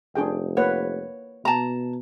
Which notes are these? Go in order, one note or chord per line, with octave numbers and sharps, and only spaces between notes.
F1 D4 G#4 G5
A#3 B4 C#5 F#5
B2 A5 A#5